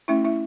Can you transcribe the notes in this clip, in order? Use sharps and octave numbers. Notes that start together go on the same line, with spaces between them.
A3 C#4 E4 E5
E4 E5